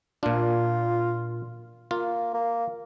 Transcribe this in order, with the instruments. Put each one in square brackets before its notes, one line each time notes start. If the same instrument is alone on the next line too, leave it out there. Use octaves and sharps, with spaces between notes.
[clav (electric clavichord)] A#2 D4 [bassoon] F4
[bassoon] A#3 [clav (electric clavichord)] F4
[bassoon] A#3